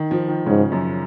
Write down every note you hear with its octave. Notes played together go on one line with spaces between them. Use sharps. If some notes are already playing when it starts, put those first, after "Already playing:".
Already playing: D#3
F3
D#3
G#2 C#3
F#2